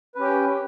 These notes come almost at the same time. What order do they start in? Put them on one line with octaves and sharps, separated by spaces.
B4 C#4 G4 G5